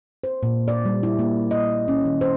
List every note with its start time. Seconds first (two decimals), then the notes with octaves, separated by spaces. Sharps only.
0.24 C5
0.43 A#2
0.68 D5
0.85 G3
1.03 E4
1.19 A#3
1.51 D#5
1.88 C#4
2.05 D#3
2.21 C5